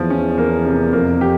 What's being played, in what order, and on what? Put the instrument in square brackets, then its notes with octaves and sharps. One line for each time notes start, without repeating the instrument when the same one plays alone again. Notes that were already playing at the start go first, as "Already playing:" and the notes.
Already playing: [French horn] E2 [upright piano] F3
[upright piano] C#4
A#3
C3
[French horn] F2 [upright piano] A#3
[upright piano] G4